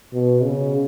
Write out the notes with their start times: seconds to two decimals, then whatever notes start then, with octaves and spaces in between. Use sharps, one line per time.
0.14 B2
0.42 C#3